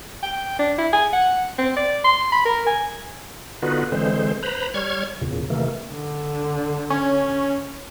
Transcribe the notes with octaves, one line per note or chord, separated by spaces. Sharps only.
G5
D4
E4
G#5
F#5
C4
D5
C6
B5
A#4
G#5
D3 B3 D#4 F4 F#4 B4
D3 E3 G#3 C4 C5
B4 C5 A#5 B5
G3 C#5 C#6 F6 G#6
E2 A#2 C#3
C3 D#3 E3 A3 A#3
D3
C#4